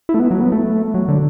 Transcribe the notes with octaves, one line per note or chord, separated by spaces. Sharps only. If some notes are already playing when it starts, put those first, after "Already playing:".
E4
A3
B3
F#3
B3
A3
F#3
D3